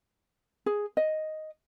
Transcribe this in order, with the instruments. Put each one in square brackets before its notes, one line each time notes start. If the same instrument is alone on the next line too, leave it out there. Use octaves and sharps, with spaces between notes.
[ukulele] G#4
D#5